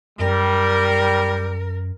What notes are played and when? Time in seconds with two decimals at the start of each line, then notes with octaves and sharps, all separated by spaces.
0.19 F#2 G3 A#4